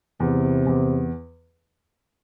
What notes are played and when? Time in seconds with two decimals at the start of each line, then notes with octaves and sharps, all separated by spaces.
0.20 E2 C3
0.67 E2